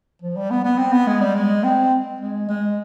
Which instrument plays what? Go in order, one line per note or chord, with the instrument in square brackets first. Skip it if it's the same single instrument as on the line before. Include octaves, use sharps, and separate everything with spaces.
[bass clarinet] F3
G3
B3
B3
C4
B3
G#3
G3
G#3
C4
G#3
G#3